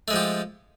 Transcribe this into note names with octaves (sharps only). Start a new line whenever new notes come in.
F3 G#3 A3 G4